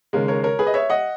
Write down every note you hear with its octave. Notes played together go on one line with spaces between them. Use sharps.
D#2 C#3 G#3 A#4
A#4 C#5
A#4 C#5
G#4 B4
D#5
C#5 E5
D#5 F#5